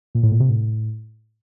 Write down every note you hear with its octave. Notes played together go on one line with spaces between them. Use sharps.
A#2
A2
A#2
C3
A2